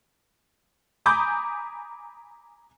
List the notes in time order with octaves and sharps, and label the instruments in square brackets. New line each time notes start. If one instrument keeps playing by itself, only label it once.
[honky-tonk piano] G#5 A#5 B5 D6 D#6 G6